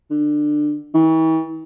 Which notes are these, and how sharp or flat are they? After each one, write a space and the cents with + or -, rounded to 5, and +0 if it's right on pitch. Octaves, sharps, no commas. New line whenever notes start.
D3 +20
E3 -45